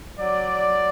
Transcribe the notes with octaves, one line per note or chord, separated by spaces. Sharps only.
F#3 D5